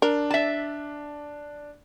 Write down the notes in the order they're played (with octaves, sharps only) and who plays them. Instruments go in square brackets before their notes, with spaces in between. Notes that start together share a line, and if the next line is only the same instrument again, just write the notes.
[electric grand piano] D4 [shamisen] A#4
[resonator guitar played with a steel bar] E5 A5